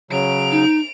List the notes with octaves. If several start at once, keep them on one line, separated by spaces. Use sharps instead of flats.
C#3 F#3 D7 F7
D#4